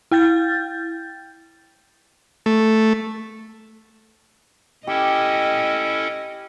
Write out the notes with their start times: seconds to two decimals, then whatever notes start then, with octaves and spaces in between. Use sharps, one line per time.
0.11 E4 G5 G6 A6
2.46 A3
4.87 C#4 E4 G4 A4 D#5